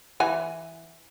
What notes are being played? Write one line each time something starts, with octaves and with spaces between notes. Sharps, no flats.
E3 F#5 G#5